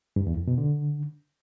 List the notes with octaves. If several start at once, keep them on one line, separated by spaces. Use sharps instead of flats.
G2
E2
F2
B2
D3